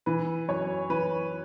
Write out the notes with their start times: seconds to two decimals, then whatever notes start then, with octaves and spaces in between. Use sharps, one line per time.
0.06 E3 B4
0.48 F#2 C#5
0.90 E3 B4